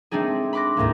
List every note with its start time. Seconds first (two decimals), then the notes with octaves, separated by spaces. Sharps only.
0.11 G#3 A3 C4 D4 D#4 G#4
0.53 B5 C6 D6 F#6 A#6
0.77 D#2 A2 G#3 A#3